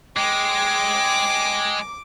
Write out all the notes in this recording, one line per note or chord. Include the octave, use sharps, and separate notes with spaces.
G#3 G5 D6